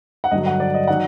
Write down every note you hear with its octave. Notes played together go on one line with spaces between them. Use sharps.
F#5
G2 D3 F#3 D#5
F#5
D5
D#5
D#3 F#3 F#5